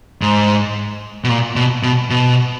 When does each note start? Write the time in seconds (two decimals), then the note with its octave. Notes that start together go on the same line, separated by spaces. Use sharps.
0.22 G#2
1.24 B2
1.29 A#2
1.56 B2
1.83 B2
2.10 B2